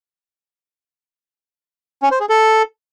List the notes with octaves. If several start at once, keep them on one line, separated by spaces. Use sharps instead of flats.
C#4
C5
G#4
A4